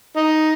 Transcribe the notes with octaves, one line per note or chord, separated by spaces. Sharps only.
D#4